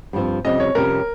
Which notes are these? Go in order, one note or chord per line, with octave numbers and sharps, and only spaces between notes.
G2 F3 C4
F2 C3 G3 C#4 D#5
C#5
F2 C3 G3 C#4 A#4